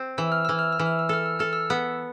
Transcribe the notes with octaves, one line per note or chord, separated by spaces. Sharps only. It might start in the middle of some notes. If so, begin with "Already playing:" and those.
Already playing: C4
E3 E6
F6
E3 E6
F6
E6
E3
F6
E6
A4 F6
E6
A4 F6
E6
B3